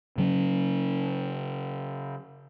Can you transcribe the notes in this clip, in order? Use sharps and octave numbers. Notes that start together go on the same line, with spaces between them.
C#3 F#3 C4 C#4